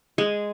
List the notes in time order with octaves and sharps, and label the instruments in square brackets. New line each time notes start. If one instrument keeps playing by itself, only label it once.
[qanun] G#3 G#4